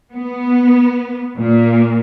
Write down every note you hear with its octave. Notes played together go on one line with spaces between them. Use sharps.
B3
A#2